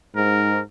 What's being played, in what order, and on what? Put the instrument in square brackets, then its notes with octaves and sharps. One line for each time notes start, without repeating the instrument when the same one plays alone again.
[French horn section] G#2 [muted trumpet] A#4